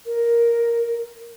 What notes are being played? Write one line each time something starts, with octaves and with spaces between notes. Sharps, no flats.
A#4